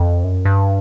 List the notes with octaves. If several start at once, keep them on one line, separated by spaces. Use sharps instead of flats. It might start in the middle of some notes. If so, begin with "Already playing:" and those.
Already playing: F2
F#2
G2